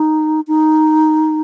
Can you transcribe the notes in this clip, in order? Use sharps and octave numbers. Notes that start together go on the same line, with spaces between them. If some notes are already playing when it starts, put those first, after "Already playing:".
Already playing: D#4
D#4